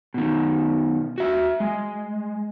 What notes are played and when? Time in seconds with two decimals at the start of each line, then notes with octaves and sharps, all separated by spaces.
0.14 B2 D#3
1.18 F#4 E5
1.60 G#3